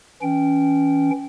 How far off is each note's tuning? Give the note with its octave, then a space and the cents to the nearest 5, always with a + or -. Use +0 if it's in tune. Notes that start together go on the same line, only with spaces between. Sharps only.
E3 -10 C#4 +10 G5 -15